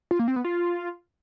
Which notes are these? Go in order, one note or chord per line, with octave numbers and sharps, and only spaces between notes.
F4
A#3
C4
B3
F4